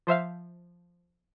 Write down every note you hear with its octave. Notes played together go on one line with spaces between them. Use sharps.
F3 C5 E5 F5